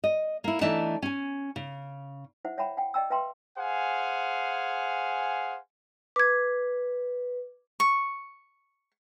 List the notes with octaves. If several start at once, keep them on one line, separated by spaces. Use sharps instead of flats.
D#5
A#3 E4
E3 A3 D4 D#4 A5
C#4 G#5
C#3
E4 C5 E5 F#5
C#5 E5 F#5 G5 A#5 B5
F#5 G5
D5 D#5 G5 A#5 E6
B4 E5 F5 G5 A#5 C6
G#4 C5 F5 F#5 G#5
B4 D6 G#6
C#6